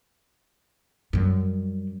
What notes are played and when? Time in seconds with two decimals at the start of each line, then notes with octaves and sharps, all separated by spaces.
1.13 F#2 G3